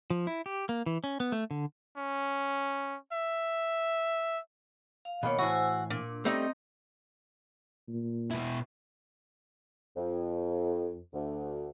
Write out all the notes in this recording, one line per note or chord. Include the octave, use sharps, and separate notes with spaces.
F3
E4
G4
A#3
E3
C#4
B3
A3
D3
C#4
E5
F5
B2 D#3 A#3 C#5 B5
A2 E3 F#4 C5 G#5 E6
A#2 D4
G3 A3 C4 D#4 D#5
A#2
B2 E4
F2
D2